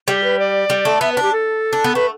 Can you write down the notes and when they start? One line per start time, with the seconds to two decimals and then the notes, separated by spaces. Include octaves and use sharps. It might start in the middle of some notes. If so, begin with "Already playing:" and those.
0.08 G3 G4
0.24 B4
0.39 D5
0.70 G3
0.85 A3
1.01 B3 E5
1.12 B4
1.17 D4
1.22 G4
1.33 A4
1.73 D4
1.84 B3
1.95 A3 B4